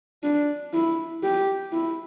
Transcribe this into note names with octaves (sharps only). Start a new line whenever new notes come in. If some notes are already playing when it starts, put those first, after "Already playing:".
D4
E4
G4
E4